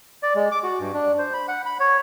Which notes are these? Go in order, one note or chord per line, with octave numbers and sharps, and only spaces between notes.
D5
G#3
D6
F#4
G2
D4
C5
B5
F#5
B5
C#5